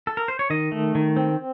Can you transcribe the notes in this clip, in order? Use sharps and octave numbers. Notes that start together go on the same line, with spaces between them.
A4
A#4
C5
C#5
D#3 D#5
A3
D#3
C4